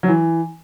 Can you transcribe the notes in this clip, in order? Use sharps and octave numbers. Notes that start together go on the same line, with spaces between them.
F#3
E3